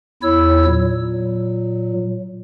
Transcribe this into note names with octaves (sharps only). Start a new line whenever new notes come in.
E2 E4 C#5 E6
A#2 F#3